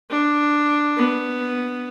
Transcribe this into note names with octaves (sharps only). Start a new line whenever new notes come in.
D4
B3